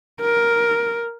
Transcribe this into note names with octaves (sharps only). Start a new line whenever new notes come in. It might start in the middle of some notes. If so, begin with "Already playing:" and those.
A#4